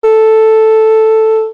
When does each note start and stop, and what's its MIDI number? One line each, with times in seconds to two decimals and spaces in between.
0.04 1.47 69